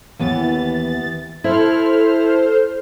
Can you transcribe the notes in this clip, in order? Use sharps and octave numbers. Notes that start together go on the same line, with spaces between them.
D#2 E3 B3 A6
E4 A4 C5 F6